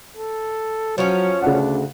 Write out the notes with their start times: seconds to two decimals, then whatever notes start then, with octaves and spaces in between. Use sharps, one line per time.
0.17 A4
0.98 F3 F#3 C#4 C#5
1.42 D2 C#3 D4 F#5